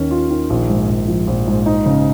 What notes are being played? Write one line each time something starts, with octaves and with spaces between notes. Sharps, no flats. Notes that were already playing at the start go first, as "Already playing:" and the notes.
Already playing: D#2 D#3 C#4
F4
D#3
A#1
G#2
A#1
F3
A#1
G#2
D#4
C#3